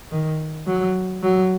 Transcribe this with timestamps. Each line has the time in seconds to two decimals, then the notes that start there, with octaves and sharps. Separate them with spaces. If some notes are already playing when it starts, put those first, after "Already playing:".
0.12 D#3
0.67 F#3
1.23 F#3